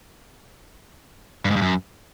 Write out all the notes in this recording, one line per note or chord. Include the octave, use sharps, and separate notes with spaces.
G2
G#2
G2
F#2